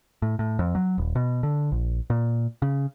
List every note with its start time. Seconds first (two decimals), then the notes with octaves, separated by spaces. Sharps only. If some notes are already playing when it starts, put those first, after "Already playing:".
0.22 A2
0.39 A2
0.59 F2
0.75 F#3
0.98 D#1
1.15 B2
1.43 D3
1.72 A#1
2.10 A#2
2.62 C#3